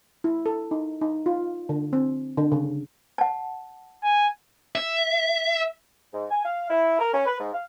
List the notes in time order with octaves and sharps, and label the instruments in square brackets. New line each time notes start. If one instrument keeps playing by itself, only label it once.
[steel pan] E4
A4
D#4
D#4
F4
D3
C4
D3
C#3
[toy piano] F#5 A5
[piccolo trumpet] G#5
[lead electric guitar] E5
[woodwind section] G#2
G#5
F5
E4
A#4
C#4
B4
G#2
F5